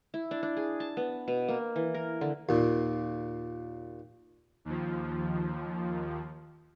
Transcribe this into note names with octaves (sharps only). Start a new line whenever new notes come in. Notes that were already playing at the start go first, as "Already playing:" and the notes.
E4
D4
D4
G#4
A5
B3
B2
A#3
E3
A#4
D3
D#2 A#2
D#2 F3